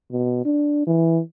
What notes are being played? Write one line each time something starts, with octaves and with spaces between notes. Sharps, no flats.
B2
D4
E3